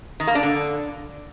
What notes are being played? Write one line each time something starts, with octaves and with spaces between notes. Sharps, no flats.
D#3
A#3
D4
D3